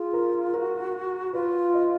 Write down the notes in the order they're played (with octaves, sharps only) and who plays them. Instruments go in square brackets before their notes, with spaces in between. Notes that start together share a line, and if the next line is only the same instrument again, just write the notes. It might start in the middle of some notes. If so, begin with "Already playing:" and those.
Already playing: [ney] F4 [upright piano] G#4
[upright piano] A#4
[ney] F#4 [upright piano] A#4
[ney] F4 [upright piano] B4
[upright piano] D#5